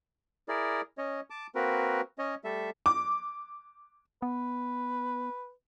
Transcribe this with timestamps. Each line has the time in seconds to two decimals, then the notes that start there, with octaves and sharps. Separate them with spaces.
0.48 E4 G#4 A#4 D5
0.98 C#4 C#5 D#5
1.30 A5 D6
1.55 A#3 C4 F#4 A#4 B4
2.19 C#4 C#5 D#5
2.44 G3 A3 A4 E5
2.86 D6
4.22 B3 B4